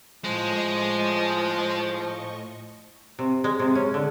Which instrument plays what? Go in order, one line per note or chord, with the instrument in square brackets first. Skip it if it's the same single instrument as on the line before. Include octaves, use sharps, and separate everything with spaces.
[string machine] A2 D#5 C#6 [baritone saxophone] F3 [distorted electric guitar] G#3
[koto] C3
G#3
C3
C#4
D3